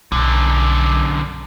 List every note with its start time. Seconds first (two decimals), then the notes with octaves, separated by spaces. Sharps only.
0.12 B1 F#2 D3